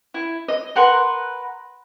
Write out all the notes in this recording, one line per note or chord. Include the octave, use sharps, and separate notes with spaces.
E4
D#5
A#4 B4 F#5 C6